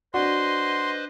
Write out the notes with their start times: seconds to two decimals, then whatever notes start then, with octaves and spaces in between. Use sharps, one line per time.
0.14 D4 F#4 B4 C5 D#5 C6